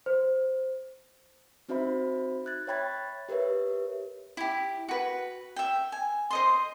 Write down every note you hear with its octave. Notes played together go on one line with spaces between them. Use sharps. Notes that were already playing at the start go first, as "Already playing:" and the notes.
C5
C4 D#4 F#4 C5 E5 B5
F#6 G#6 A6
C#5 E5 G5 B5 G#6 A6
G4 A#4 B4 C#5 E5
E4 G4
F#4 B4
E5 G5
G#5
C5 D#5 C6